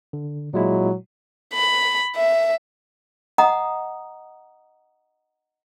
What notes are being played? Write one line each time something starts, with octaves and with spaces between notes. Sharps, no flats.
D3
A#2 F#3 G#3 E4
B5
E5
D#5 F#5 A#5 D#6